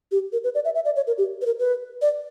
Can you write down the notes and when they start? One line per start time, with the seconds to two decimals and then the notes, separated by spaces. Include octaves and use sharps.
0.12 G4
0.33 A#4
0.44 B4
0.55 D5
0.65 E5
0.75 E5
0.85 D5
0.96 C#5
1.07 A#4
1.18 G4
1.42 B4
1.46 A#4
1.59 B4
2.02 D5